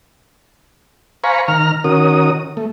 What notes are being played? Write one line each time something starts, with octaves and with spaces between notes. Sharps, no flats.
C5 F5 G#5 A#5 B5 C#6
D#3 A#5 F6
D#3 C#4 F#4 A#4 D#6
A3